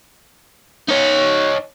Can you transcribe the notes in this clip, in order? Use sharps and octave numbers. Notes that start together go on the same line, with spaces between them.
D#4 C#5